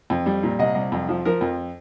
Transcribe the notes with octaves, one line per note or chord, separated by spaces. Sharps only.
F2
G3
A#2
C2 D#5
C2
F2
F3
F3 A#4
F2